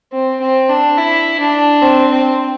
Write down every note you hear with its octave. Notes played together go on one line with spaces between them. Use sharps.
C4
C4
D4
E4
D4
C4
C4